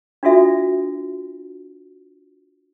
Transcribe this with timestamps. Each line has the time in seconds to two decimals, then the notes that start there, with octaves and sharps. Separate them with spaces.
0.23 D4 F4 F#4 A4 E5